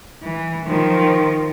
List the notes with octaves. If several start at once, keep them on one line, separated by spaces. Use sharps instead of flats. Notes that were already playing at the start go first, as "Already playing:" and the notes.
E3
D#3 F3